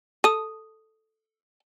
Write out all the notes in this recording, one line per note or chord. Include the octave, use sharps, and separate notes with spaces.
A4 D#6 D#7